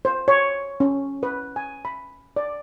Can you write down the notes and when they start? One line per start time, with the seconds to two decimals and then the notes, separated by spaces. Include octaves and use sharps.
0.05 C5
0.28 C#5
0.80 C#4
1.23 B4
1.56 G#5
1.85 B5
2.36 D5